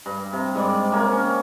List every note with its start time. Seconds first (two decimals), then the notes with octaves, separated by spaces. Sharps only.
0.06 G2
0.33 C3
0.55 G#2 G3 D5
0.92 C3 A#3 C#4
1.12 C#4